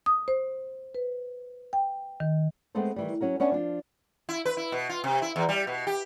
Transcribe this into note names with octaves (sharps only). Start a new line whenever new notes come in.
D#6
C5
B4
G5
D#3
G#3 A3 B3 C4 A4 C5
D#3 E3 G3
F#3 C#4 F#4 A#4
B3 C#4 D4 E5 G#5 A5
F3 D4 F4
E4
B4
E4
B2
F4
C3
E4
E2
G3
B2
G4